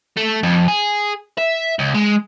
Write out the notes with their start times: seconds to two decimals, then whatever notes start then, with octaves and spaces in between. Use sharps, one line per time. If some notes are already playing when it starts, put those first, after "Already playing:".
0.17 A3
0.43 F2
0.68 G#4
1.38 E5
1.79 C#2
1.95 G#3